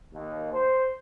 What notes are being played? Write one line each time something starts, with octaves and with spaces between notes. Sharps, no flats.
D#2
C5